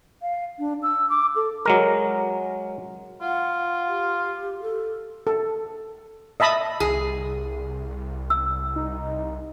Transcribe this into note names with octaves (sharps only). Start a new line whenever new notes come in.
F5
D4
E6
D6
A4
F#3 G#3 A#4
F4 F#5
G4
A4
A4
D#5 E5 A5 B5 D#6
C2 G#4
E6
D#4